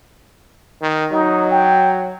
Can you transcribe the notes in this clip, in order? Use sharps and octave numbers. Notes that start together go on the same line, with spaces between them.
D#3
F#3 D#4
G5